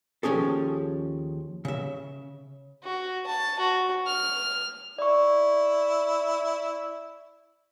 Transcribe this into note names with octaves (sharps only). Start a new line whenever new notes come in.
D#2 F3 C#4 G#4 A4
C#3 E5
F#4
A5
F#4
F6
E4 D5 C#6